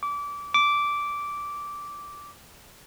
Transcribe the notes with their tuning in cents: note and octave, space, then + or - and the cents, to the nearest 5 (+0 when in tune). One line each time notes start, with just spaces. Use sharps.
D6 -25
D6 -10